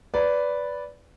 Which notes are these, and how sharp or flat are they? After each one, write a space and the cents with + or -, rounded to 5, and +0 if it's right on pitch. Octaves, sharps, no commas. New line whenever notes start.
B4 +0 D5 -15